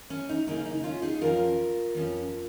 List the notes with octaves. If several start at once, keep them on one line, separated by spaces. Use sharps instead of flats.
C#4
D#4
C#3 A#3 C#4 D#4
D#4
C#4 F4
D#4 G#4
F2 F3 C#4 F4 A#4
F2 F3 C#4